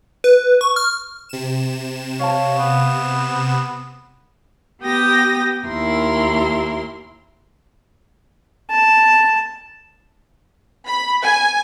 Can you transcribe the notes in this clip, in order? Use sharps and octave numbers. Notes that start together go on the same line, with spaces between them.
B4
C#6
F6
C3 E7
C#5 F5 A5
B3
B3 G4 G5 D#6 A#6
D#2 E4 A#4 C6
A5
B5
G#5